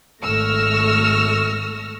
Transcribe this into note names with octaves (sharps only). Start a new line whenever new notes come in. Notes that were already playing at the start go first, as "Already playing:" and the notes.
G#1 A3 C#6 E6 F6 A#6